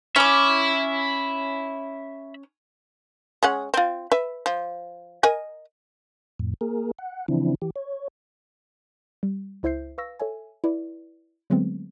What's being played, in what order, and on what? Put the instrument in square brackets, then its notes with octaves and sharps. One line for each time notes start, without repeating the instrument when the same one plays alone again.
[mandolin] C#4 D6 [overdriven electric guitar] E5 B5
[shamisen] G#3 C#4 F#5
C4 F4
B4 E5
F3
A#4 D#5 G#5
[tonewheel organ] F2 A2
A#3 G#4 A#4
F#5
C#3 E3 F3 C4 D4 E4
E3 G4
C#5
[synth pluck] G3
C#2 E4 C5 E5 G6 C7
B4 F5 C#6 E6 A#6
A4 C#5 E5 G#5
E4 B4 D5
D3 F#3 G#3 A3 B3 C4